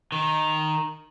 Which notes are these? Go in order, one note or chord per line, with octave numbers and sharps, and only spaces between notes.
D#3